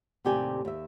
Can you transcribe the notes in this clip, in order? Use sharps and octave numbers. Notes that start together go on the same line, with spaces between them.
D#2 A2 C3 G4 D5 G#5
D#2 E5